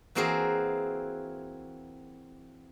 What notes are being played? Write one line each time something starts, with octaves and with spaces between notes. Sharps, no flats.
E3 A#3 C4 F#4 G#4 A#4